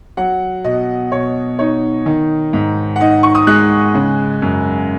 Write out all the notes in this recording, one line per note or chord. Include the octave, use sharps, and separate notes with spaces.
F#3 F#5
B2 D#5
B2 C#5
D#4 C#5
D#3
G#2
F#5
D#4 D#5
C#6
D#6
G#3 F#6
C#3
F#2